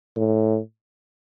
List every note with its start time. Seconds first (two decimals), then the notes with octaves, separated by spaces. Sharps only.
0.16 A2